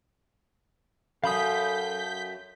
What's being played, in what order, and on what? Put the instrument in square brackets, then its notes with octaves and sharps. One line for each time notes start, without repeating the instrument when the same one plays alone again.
[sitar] F#2 [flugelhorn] A4 [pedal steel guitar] F5 B5 D#6 [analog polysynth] G6 B6